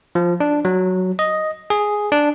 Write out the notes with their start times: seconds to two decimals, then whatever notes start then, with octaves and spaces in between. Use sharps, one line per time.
0.15 F3
0.40 D4
0.65 F#3
1.19 D#5
1.70 G#4
2.12 D4